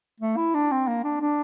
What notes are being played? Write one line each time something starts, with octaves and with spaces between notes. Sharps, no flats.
A3
E4
D4
C4
A#3
D4
D4